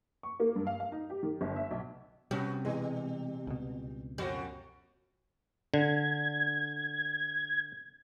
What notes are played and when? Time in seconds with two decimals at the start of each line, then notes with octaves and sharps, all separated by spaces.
0.23 C#6
0.40 A#3
0.56 G2
0.67 F5
0.80 F5
0.92 D#4
1.10 G4
1.23 D#3
1.41 G1
1.56 E5
1.71 B1
2.31 C3 G3 B3 C#4 F#4
2.65 B2 E3 G3 G#3
3.47 C#2 B2
4.18 F#2 F3 G3 F#4
5.74 D3 G#6